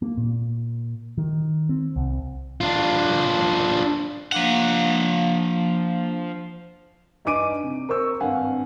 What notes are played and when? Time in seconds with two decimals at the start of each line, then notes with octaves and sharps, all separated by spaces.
0.02 A#3
0.17 A#2
1.18 D#3
1.69 C4
1.96 C2
2.61 D4 F4
4.32 F3 A#3 D4 F5 F#5
7.25 G2 D#4 G#5 D6 D7 D#7
7.64 C3
7.89 A#4 C5 C#6 E6
8.20 G#1 G2 F5 F#5 G#5